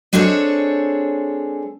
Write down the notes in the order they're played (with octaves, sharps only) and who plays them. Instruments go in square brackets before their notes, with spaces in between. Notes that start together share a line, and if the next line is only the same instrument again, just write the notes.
[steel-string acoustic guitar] G#3 C4 D4 G#4 A4 C#5